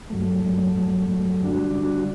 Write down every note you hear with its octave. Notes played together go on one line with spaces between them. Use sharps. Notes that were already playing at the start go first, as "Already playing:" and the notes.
G2 F#3 A3
G2 F#3 A3
G2 F#3 A3
G2 F#3 A3
D3 G3 D4 F#4
D3 G3 D4 F#4